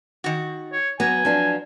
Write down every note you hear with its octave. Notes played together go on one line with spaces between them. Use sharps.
D#3 F#4
C#5
F#3 B3 G#5
F3 D4